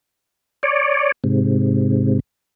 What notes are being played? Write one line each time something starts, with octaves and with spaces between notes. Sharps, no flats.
C#5 D5
G#2 C3